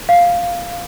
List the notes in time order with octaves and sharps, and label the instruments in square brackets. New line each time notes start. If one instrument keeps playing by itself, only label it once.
[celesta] F5